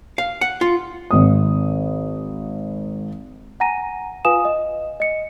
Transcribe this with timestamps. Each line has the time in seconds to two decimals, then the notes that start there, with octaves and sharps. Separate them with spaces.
0.18 F5
0.41 F#5
0.61 F4
1.11 G#1 D#6
3.60 F#5 G#5 A#5 A#6 D#7
4.25 F4 B4 F5 G#5 D#6 E7
4.45 D#5
5.00 D#5 C#7